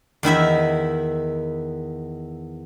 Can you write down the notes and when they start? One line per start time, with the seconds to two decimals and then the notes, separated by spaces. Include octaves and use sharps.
0.23 E2 D#3 E4 E5